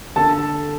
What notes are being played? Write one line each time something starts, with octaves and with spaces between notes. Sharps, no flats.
D3 A4 A5